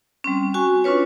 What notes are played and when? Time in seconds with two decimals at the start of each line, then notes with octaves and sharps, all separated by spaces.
0.24 G3 C4 C#4
0.54 F#4 G#5 C#6
0.84 C#4 D4 F4 B4 C#5